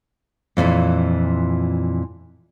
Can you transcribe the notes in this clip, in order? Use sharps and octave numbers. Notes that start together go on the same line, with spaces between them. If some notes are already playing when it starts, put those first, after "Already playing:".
F2 A#2 D3 E3